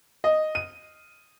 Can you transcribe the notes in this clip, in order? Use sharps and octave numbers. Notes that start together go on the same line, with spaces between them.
D#5
D#7